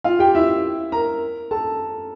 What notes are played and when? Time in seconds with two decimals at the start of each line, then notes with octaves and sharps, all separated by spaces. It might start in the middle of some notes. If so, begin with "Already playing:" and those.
0.04 F4 F5
0.19 G4 G5
0.35 E4 E5
0.92 A#4 A#5
1.51 A4 A5